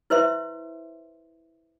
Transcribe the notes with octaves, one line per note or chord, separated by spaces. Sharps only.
E4 B4 C5 E5 C6